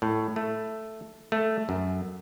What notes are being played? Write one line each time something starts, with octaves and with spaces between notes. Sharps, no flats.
A2
A3
A3
F#2